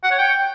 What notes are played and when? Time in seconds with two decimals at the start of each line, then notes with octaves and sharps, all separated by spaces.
0.04 F#5
0.11 C#5
0.18 G5